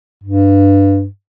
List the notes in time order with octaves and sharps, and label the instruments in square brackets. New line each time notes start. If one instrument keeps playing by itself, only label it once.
[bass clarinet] G2